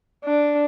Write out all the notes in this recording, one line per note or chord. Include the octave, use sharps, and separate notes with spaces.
D4